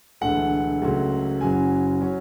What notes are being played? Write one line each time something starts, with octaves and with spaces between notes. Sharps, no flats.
E1 D2 D3 A3 F#5
C#2 C#3 F#3 A3
F#1 F#2 C#3 F#3 G#5
F#3 C#4